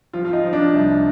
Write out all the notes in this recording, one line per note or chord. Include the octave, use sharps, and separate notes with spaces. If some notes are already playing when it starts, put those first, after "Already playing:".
F3 F4
F4
D#4
F3
D4
C2